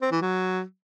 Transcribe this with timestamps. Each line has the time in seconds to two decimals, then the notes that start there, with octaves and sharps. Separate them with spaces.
0.02 C4
0.11 E3
0.21 F#3